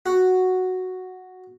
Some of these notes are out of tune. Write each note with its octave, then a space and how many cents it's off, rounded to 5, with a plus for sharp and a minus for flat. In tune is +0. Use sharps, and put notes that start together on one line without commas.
F#4 +0